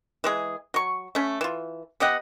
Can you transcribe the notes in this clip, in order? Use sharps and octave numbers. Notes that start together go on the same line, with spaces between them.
E3 G#3 G#4
F#3 C#6
A3 C#4
E3 F4
B3 G4 D#5 F#5